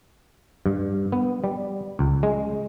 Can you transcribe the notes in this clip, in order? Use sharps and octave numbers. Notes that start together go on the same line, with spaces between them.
G2
B3
G3
C#2
G#3